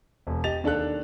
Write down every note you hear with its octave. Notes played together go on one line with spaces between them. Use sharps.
E1
G4 D#5 A6 F7
D#2 D4 A4 F#6